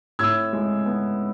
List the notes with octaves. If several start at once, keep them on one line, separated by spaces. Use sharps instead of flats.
A2 E6 G#6
G#3
B3